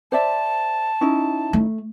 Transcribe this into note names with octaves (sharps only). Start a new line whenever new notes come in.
C5 D5 E5 A5
C#4 D#4 E4
A3